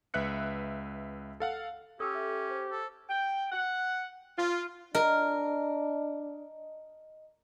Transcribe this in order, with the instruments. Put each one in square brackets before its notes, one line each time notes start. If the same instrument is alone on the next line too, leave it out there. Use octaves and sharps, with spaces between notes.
[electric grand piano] C#2 B4 E5 F#6 C#7
A4 F5 F#5
[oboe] C#4 [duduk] G4 [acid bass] A4 [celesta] D#6 E6
[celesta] E5
C5
[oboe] A4
[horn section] G5
F#5
F4
[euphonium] D4 [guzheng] A#4 [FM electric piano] D#5